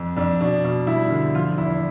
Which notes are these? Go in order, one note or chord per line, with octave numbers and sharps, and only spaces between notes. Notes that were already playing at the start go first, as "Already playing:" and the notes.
Already playing: F2
F2 D4
B2 D4
B2
G2 E4
D3
F3 F4
E2 E4